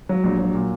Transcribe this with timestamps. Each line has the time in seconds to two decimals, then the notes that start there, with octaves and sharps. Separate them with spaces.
0.09 F#3
0.24 A#1
0.39 F#3
0.54 A#2